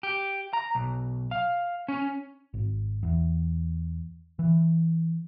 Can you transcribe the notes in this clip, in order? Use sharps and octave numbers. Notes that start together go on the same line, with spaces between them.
G4
A#5
B1
F5
C#4
G#1
E2
E3